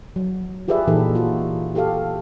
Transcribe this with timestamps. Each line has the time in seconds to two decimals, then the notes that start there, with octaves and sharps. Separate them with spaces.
0.16 F#3
0.68 F4 G4 G#4 B4 D5 E5
0.88 A#2 E3 D#4 G4 A4
1.15 F4 F#4
1.75 F#4 G4 A4 F5